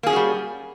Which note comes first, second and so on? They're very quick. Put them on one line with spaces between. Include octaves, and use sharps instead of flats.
A#3 G#4 C#4 F#4 G3